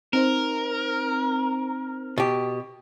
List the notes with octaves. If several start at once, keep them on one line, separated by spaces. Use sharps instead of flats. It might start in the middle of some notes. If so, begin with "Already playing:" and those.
C4 D#4 A#4 C5
B2 G4